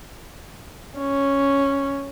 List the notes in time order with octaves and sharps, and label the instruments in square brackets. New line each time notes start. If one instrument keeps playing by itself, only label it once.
[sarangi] C#4